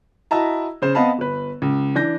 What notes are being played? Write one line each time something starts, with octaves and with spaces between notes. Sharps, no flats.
E4 F#4 D#5 E5 A5 A#5
C#3 C5 E7
B3 C4 D#5 F5 A5 B5
G1 B4
C#2
E3 D4 G6 A#6